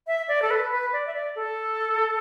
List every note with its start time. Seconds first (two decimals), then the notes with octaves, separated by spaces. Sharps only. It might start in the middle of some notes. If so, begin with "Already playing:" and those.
0.07 E5
0.28 D5
0.42 A4
0.50 B4
0.71 B4
0.93 D5
1.06 E5
1.14 D5
1.35 A4